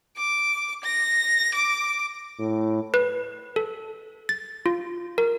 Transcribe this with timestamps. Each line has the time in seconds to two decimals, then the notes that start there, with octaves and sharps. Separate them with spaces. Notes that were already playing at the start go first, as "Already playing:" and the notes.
0.17 D6
0.84 A#6
1.55 D6
2.39 A2
2.94 B4
3.56 A4
4.29 A6
4.66 F4
5.18 A#4